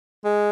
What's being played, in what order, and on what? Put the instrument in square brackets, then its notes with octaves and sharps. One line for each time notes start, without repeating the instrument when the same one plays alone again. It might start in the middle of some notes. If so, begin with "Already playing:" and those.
[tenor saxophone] G#3